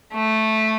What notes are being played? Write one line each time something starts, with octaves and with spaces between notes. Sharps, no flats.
A3